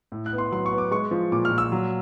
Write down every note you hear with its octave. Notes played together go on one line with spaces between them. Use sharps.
A2
F#6
B3
C6
F#3 C6
C#6
B3
D6
G#3 C#6
F3
A#2 D6
F6
A#2
E6
F#3